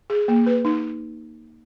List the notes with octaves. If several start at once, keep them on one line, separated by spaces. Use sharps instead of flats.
G#4
A#3
B4
D#4